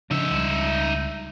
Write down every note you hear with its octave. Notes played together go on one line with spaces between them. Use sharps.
C#3 F3 D4 D#4 E5
C#2 G3